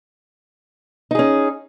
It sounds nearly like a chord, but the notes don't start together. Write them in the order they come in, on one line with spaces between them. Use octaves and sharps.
D#4 G#4 C#4